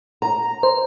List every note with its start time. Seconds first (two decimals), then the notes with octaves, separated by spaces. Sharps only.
0.22 A#5
0.63 C5